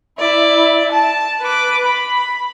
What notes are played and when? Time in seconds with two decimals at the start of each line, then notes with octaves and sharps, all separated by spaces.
0.18 E4 D5
0.92 A5
1.41 B4 D6
1.85 B5